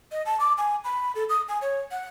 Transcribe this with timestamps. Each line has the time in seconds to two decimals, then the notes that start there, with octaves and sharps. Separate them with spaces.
0.11 D#5
0.26 A5
0.40 D6
0.58 G#5
0.84 B5
1.15 A4
1.29 D#6
1.48 G#5
1.61 C#5
1.91 F#5